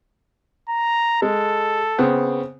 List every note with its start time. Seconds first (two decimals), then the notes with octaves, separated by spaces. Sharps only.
0.69 A#5
1.22 G#3 A4
1.98 C#3 B3 C4